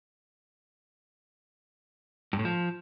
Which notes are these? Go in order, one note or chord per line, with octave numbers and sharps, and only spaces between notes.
G2
A2
F3